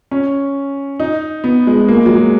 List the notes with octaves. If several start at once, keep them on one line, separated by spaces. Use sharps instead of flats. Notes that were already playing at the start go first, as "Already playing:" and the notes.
C#4
D#4
B3
G#3
A#3
G#3
F#3
G#3